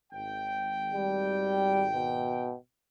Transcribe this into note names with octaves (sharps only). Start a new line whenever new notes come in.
G#1 G5
G3
B2